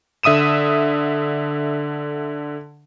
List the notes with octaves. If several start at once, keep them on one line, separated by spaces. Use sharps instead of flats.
D3 E5 D#6 D#7 E7